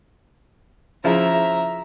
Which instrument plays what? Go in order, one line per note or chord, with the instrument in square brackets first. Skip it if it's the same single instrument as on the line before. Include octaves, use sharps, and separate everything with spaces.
[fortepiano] C#3 F3 E4 [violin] E5 A#5